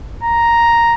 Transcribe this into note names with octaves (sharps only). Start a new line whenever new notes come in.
A#5